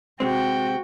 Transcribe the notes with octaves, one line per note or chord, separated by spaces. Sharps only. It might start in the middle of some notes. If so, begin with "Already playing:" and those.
C3 G#3 C4 F#4 G5